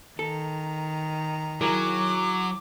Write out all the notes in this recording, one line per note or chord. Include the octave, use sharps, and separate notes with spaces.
D#3 A4 A#5
F#3 E4 G#4 A#4 D6